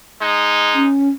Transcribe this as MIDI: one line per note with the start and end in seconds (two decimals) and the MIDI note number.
0.21 0.87 56
0.21 0.87 63
0.74 1.09 61